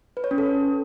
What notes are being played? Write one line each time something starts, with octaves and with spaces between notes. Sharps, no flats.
B4
C#5
C#4
A4